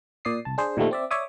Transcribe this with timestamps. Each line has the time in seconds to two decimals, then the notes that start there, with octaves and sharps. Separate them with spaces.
0.25 A#2 D5 D#6 C7
0.45 C2 A5
0.58 D4 G#4 C5
0.77 A#2 D#3 F3 G3 A3
0.91 C4 D5 E5
1.11 C#5 D5 E5 D6 D#6